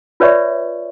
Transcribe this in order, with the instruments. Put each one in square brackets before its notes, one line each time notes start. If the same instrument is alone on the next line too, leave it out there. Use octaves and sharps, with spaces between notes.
[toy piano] F4 B4 C#5 D5 E5 C#6